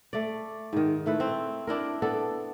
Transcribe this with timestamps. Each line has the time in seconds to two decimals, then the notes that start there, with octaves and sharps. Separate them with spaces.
0.13 A3 D5
0.73 G#2 D#3
1.06 A3 E4 B4
1.20 C4
1.67 D4 E4 A#4
2.02 B3 D4 A4